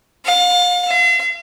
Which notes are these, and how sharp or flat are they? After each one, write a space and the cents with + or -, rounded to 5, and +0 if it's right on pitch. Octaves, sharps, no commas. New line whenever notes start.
F5 +35
F5 -45